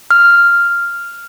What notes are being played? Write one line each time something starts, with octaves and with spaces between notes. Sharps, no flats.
F6